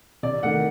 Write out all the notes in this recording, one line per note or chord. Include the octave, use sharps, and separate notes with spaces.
C3 D5
D#3 A3 F#5